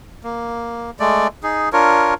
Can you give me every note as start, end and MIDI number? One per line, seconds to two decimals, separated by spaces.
0.24 0.90 58
1.00 1.27 56
1.00 1.27 57
1.00 1.27 74
1.43 1.69 63
1.43 1.69 68
1.73 2.14 62
1.73 2.14 65
1.73 2.14 70
1.73 2.14 73